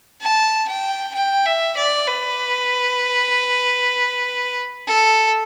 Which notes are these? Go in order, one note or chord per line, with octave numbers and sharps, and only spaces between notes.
A5
G5
G5
E5
D5
B4
A4